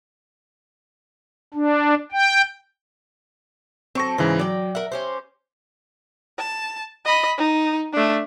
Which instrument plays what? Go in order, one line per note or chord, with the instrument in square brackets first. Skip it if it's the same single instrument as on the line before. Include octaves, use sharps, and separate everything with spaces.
[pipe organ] D4
G5
[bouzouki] F#3 A4 [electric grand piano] C4 C#6 A#6
[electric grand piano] G#2 C#3 E3 [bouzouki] C5
[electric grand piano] F#3 [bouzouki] D5 G5
[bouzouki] A#4 F#5 [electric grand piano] E5
[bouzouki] C#4 G4 C5
[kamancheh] A5
D#5 B5
D#4
A3 D4